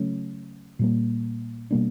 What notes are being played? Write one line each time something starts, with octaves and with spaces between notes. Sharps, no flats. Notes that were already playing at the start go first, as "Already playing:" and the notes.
Already playing: C#3 F#3 A3 C#4
A#2 G3 A#3
B2 G3 A#3 D4